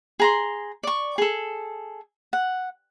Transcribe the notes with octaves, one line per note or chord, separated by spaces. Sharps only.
G#4 A#5 C6
D5 C#6
G#4 A4
F#5